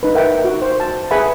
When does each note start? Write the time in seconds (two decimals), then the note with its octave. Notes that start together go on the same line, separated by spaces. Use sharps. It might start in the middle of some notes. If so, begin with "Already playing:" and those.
0.03 D#4 B4
0.15 A#4 E5 F#5 G5
0.44 F#4
0.62 C5
0.80 A5
1.11 G#4 B4 E5 F#5 G#5 B5